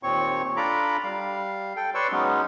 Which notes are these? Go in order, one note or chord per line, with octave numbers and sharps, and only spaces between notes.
D#2 A#2 C4 C#5 C#6
D4 F4 A4 A#5 B5 D6
G3 F5
A4 G5
B4 C#5 D5 C6 C#6 E6
F#3 G#3 B3 C#4 D#4